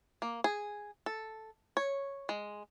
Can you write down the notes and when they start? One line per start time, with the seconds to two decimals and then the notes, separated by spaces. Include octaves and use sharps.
0.22 A#3
0.44 G#4
1.06 A4
1.77 C#5
2.29 G#3